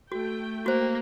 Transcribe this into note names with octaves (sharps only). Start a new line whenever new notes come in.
A3 F#4 G5
A#3 F#4 C5